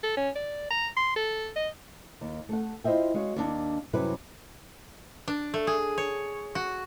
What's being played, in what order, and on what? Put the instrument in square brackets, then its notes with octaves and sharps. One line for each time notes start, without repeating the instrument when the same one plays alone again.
[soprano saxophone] A4
C#4
D5
A#5
C6
A4
D#5
[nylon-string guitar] D#2
A3 A4 F#5
E4 F4 C5 D#5 E5 G5
G#3 F#4 C#5 F5
D#2 D4
F#2 C3 F#3 G3 E4 B4
[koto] D4
A3
G#4
C#5
F#4